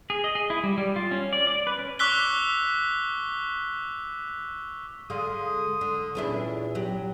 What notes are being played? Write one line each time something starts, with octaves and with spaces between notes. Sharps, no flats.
G#4
D#5
G#4
E4
G3
G3
F4
C#4
D5
D5
B4
C#4
C#6 D6 E6 F#6 B6 G7
D3 G#3 F5 C6 D#6
D3
E2 A#2 C#4 D4 E4
F#3 G4